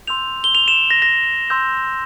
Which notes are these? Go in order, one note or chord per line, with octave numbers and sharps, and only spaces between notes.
C6 E6 G6 F7
G7
F7
E7
A#6
A#6
C6 E6 G6